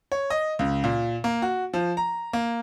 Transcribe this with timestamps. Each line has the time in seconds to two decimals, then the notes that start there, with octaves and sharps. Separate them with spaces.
0.12 C#5
0.30 D#5
0.59 C#2
0.84 A#2
1.24 A#3
1.42 F#4
1.73 F3
1.97 A#5
2.33 A#3